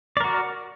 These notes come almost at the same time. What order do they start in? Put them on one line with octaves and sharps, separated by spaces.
D5 A#4 F#4